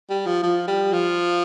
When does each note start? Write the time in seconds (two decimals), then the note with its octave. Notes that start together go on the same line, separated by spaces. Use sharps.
0.10 G3
0.26 F3
0.43 F3
0.68 G3
0.93 F3